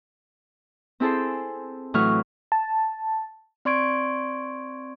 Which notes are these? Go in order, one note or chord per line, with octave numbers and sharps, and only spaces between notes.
C4 E4 G#4 A4 C5
A2 E3 F#3 C#6 F6
A5
C4 D5 C6 C#6 G#6 D7